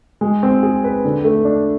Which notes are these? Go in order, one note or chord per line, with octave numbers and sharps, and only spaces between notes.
G#3
C4
G#4
B4
D3
A3
D4